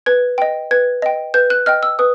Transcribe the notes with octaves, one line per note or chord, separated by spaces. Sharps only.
B4 G#6
D#5 G5
B4 G#6
D#5 G5
B4 G6
F#6
D#5 G5 F6
E6
B4 D#6